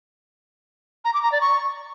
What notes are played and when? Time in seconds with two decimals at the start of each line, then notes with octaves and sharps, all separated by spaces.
1.05 A#5
1.14 D6
1.23 A#5
1.32 D5
1.41 C#6